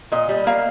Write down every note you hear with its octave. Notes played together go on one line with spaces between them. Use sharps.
A#2 D#5
G3
A#3 F5